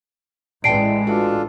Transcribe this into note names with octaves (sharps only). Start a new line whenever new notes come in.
A1 E3 G#3 D5 G5 A5 C7 D7
D4 F4 F#4 A4